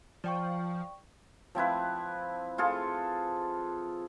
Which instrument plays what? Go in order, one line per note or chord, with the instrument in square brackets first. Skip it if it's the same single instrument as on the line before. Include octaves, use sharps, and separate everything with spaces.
[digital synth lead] F3 [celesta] D5 G5 C#6
[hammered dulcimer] F3 C4 E4 B4
F4 G#4 A4